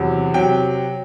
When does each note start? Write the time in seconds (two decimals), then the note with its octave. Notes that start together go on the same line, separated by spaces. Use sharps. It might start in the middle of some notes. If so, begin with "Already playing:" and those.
Already playing: E2 C3 F#3
0.34 C3 F#3 G5